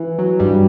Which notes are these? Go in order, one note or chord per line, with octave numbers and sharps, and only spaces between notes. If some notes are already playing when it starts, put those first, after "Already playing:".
Already playing: E3
F#3
G2 G3